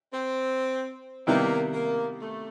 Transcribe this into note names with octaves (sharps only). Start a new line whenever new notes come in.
C4
C3 D#3 G3 A#3 B3 E4
A#3
A3